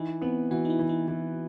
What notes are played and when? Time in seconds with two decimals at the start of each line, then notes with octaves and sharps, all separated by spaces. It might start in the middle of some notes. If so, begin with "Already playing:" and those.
Already playing: E3 D#4
0.21 B3 C4
0.51 E3 F#4
0.65 D#4
0.70 E4
0.79 E3
0.89 D#4
1.08 E3